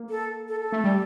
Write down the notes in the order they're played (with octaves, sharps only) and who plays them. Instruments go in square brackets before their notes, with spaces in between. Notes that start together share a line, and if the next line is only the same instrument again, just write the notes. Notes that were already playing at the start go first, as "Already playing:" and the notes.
Already playing: [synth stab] A#3
[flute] A4
A4
A4
[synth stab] A3
G3